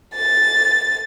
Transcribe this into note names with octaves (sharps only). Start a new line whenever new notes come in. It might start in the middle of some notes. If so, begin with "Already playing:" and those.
A6